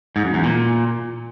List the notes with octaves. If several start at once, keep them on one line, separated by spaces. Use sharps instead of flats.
G#2
F#2
E2
A#2